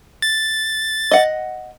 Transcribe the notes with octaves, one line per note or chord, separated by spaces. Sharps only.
A6
D#5 F#5